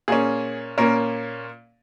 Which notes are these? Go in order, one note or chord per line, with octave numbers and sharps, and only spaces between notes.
A#2 A#3 C#4 G#4
A#2 A#3 C#4 A#4